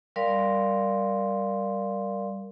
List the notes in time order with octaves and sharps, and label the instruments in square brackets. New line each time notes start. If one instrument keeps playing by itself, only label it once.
[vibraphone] G3 A#4 D5 F5 C6